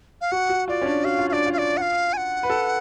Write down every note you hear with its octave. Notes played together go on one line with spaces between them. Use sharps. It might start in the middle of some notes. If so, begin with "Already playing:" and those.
F5
F#4 F#5
F#4
F4 D5
C#4
D4
F#4 F5
F4
F5
D4 D5
F4
F5
D5
F#5
F5
G#5
F#5
B4
A4